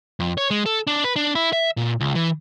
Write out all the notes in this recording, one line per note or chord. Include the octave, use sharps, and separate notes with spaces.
F2
C#5
G#3
A4
D4
B4
D4
E4
E5
A#2
C#2
E3